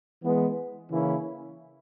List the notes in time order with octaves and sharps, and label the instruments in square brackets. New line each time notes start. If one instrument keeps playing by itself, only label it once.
[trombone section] E3 G#3 B3
C#3 E3 A#3 C#4 E4